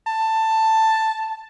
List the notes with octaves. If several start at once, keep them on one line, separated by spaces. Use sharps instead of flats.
A5